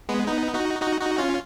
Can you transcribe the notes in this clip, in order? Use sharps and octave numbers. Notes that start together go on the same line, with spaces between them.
G#3 B3
B3 D#4
D#4 F#4
D#4 F#4
D#4 F#4
C#4 F4